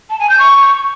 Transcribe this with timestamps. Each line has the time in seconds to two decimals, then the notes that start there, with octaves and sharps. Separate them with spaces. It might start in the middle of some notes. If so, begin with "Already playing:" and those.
0.10 A5
0.20 G#5
0.29 G6
0.39 C#6